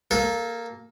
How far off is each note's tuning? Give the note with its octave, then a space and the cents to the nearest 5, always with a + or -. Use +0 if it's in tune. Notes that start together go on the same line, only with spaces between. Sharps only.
A#3 +0 A4 -25